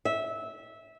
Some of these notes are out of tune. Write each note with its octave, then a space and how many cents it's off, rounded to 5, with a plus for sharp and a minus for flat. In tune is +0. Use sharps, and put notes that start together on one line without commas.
E5 -15